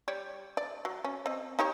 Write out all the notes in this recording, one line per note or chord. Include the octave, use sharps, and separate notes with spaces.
G3 C#5 D5
D5
F#3
C#4
C4 D#5
D#4 G4 C#5